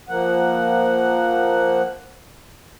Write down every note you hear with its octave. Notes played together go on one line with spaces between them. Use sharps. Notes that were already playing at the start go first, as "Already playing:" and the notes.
F3 A#3 F#5